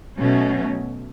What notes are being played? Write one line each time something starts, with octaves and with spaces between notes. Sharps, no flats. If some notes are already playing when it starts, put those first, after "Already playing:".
B2 F#3 A3 C#4